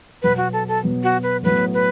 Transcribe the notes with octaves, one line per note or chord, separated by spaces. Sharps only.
B2 F#3 B3 B4
F#4
A4
A4
B2 F#3 B3
F#4
B4
A2 F#3 B3 B4
B4